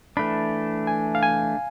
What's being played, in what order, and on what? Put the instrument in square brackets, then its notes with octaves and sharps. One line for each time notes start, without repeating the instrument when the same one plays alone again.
[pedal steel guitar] E3 A3 D4 [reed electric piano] B5
[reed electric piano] G#5
F5
G#5